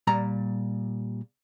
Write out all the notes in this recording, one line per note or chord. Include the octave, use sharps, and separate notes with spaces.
A#2 G3 A#5